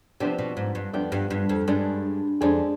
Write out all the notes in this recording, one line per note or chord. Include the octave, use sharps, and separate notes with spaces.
C3 F3 B3 D4 G4
B2
G#2
G2
F2 F3 B3 D4 G4
G2
G2
F2
G2 G#3 D4 G#4
F2 G#3 D4 G#4